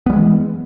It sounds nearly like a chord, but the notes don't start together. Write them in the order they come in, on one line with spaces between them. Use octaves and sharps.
B3 G3 G#3 E3